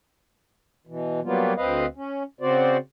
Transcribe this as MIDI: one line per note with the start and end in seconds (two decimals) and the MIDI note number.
0.87 1.20 47
0.87 1.20 52
1.24 1.53 54
1.24 1.53 55
1.24 1.53 58
1.24 1.53 59
1.24 1.53 65
1.56 1.86 38
1.56 1.86 60
1.56 1.86 71
1.56 1.86 75
1.56 1.86 77
1.96 2.23 61
2.41 2.77 49
2.41 2.77 60
2.41 2.77 66
2.41 2.77 72
2.41 2.77 74